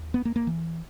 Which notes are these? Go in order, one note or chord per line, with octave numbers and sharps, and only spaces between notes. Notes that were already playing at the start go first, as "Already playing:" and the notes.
Already playing: D#2
B3
A#3
A#3
E3